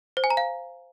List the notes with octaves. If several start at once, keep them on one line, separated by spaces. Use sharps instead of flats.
C5
G#5
A#5
F5